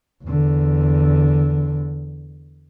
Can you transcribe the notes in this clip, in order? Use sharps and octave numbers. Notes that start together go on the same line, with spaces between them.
E2 D3